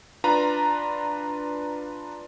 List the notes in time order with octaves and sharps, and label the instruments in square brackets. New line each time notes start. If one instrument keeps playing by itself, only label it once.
[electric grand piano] D4 F4 B4 A#5